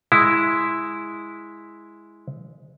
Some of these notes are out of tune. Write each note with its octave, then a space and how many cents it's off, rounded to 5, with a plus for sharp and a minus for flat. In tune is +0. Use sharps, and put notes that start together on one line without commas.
G#3 +0 E4 +0